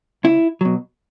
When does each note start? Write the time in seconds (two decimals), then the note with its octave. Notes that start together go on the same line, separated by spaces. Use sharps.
0.24 C#2 E4
0.61 B2 F#3